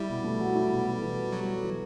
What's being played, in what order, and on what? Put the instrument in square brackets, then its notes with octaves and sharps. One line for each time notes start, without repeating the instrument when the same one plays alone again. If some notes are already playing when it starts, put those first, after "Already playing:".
Already playing: [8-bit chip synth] G3 [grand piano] E4
[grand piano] B2
A3
F#3
E4
B2
A4
E3
F#4
[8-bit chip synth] F#3 [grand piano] B3
[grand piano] A4
E3